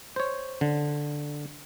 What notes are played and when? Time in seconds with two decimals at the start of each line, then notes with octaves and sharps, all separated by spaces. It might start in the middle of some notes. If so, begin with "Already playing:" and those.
0.16 C5 C#5
0.61 D3